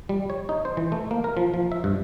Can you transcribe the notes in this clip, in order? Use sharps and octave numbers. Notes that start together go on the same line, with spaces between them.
G3
C#5
D#4
C5
E3
A3
A#3
A#4
F3
F3
E5
G2